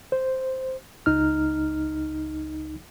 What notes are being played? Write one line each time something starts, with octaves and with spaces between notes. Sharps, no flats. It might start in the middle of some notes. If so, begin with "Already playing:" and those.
C5
C#2 D#4 F6